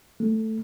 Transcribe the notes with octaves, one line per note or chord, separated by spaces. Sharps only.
A3